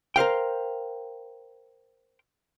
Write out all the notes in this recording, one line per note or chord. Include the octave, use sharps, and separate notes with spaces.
A#4 C5 F5 G5